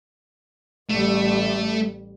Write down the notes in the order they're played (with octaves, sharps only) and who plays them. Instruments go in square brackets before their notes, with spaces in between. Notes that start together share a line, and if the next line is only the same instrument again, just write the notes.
[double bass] A1 G3 [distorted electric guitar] A3